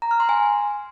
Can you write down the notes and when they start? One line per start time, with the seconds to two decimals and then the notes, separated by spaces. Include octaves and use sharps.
0.02 A#5
0.11 F6
0.20 C6
0.29 G#5